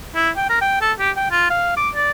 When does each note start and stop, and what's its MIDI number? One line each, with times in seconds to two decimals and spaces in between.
0.15 0.30 64
0.36 0.45 79
0.49 0.58 70
0.61 0.77 79
0.81 0.92 69
0.99 1.10 67
1.16 1.29 79
1.31 1.49 65
1.50 1.74 77
1.77 1.89 86
1.95 2.11 74